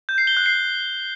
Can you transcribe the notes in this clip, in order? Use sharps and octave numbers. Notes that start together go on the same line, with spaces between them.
G6
C7
G7
F#6
C7